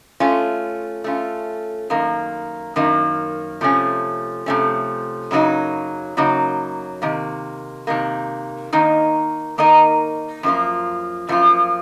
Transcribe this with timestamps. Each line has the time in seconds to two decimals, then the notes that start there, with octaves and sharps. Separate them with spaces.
0.20 A3 C#4 F4
1.04 A3 C#4 F4
1.90 F#2 D#3 A#3
2.76 F#2 D#3 A#3
3.61 C3 F3 A3 C#4
4.46 C3 F3 A3 C#4
5.31 F#2 C#3 F#3 A#3 D#4
6.17 F#2 C#3 F#3 A#3 D#4
7.02 C3 D#3 A#3
7.87 C3 D#3 A#3
8.73 D#3 A#3 D#4 A#4 D#5
9.58 D#3 A#3 D#4 A#4 D#5
10.43 F#2 F3 A#3 F4
11.29 F#2 F3 A#3 F4